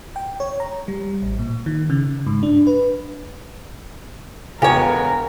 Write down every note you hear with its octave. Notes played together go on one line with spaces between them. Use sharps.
G5
C#5
A#5
G3
A1
A#2
D#3
C#3
G#2
D4
B4
E1 B3 G4 A4 A#4 C#5 F5 G#5